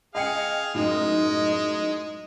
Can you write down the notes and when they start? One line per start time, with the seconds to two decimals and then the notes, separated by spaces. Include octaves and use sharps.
0.15 G#4 D#5 F5 G5 C#7
0.75 F#2 A2 G#3 D#4